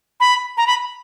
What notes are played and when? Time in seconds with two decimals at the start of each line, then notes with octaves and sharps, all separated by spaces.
0.20 B5
0.57 A#5
0.67 B5